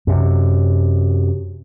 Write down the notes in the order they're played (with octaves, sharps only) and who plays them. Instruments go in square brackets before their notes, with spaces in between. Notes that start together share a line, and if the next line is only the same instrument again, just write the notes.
[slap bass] F#2 C3